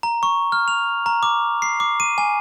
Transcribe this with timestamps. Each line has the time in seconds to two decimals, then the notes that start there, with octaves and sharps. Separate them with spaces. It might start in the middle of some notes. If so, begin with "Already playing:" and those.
0.03 A#5
0.23 C#6
0.52 F6
0.68 F7
1.06 A#5
1.23 D6
1.62 C7
1.80 D6
2.00 D#7
2.18 G#5